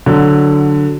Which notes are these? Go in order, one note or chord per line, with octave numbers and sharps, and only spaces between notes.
D3 F#3